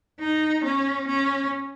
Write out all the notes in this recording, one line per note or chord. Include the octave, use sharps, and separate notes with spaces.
D#4
C#4
C#4